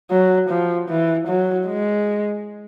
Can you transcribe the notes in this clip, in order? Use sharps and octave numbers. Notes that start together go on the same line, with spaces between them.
F#3
F3
E3
F#3
G#3